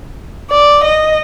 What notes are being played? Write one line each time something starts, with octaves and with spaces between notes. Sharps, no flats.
D5
D#5